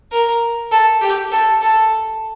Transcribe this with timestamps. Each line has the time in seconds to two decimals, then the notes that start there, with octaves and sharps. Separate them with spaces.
0.12 A#4
0.71 A4
1.01 G4
1.31 A4
1.61 A4